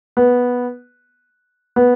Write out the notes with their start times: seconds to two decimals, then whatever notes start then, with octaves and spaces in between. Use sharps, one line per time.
0.17 B3
1.76 B3